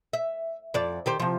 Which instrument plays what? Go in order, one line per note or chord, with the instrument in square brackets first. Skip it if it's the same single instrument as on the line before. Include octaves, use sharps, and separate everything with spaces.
[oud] E5
F2 D5
D#3 G4 C5
C3 F3